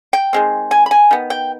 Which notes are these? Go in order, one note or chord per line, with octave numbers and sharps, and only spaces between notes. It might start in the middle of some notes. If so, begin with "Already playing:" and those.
G5
D#3 G#3 C4
G#5
B5
G#5
D#3 B3
G5